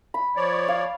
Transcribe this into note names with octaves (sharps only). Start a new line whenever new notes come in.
B5
F3 C#5 D5
F5